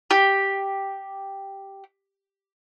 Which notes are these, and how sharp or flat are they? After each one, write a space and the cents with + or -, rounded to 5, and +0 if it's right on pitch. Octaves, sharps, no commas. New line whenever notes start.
G4 +0